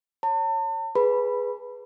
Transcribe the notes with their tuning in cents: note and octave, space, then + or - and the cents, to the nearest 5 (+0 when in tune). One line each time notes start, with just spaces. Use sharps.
C#5 +0 A5 +40
G#4 +0 B4 +0 B5 -10